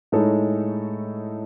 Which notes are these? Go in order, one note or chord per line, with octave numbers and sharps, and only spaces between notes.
A2 G#3 D#4 A4 C#5